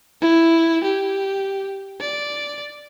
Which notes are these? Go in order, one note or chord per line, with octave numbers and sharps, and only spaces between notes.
E4
G4
D5